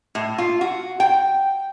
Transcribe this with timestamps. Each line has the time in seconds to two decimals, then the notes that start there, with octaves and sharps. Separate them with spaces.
0.15 A2
0.38 F4
0.61 F#4
1.00 G5